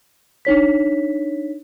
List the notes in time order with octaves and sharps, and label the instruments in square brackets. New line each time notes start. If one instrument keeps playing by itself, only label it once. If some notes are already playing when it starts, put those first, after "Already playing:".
[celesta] D4 D#4 C#5 B6